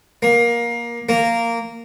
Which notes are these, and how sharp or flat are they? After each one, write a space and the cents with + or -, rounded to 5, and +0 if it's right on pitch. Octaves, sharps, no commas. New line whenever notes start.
A#3 +20
A#3 -10